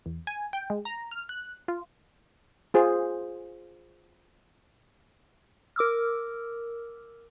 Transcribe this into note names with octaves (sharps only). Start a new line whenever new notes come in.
E2
G#5
G5
G#3
A#5
F6
F#6
F4
F4 G#4 C5
A#4 D6 E6 F6